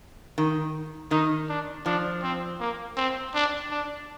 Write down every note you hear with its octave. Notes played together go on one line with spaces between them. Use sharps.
D#3
D#3 D#4
D4
F3 D4
C4
A#3
C4
D4
D4